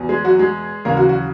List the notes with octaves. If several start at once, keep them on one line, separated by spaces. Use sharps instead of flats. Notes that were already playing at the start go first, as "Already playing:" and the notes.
Already playing: E2 B2
G#3 G#4
F#3 F#4
G#3 G#4
D#2 C#3 E3 A#3 A#4
F#3 F#4
F#3 F#4